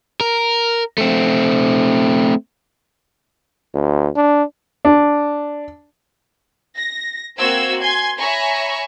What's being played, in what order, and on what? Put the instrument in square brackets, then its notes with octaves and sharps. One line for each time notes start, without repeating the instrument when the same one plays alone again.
[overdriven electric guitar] A#4
A3 C4
[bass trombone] D2
D4
[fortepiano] D4
[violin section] A#6
A#3 C4 F#4 C5 E6 G#6
G#5 C6 G#6
C#5 E5 G#5 A#5 B5 C#6